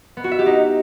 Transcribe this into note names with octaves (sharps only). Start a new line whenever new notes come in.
B3
F#4
E5
G4
D#4